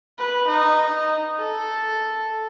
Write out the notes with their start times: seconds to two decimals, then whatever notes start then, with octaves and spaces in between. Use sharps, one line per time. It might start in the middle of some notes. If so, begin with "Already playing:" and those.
0.19 B4
0.47 D#4
1.39 A4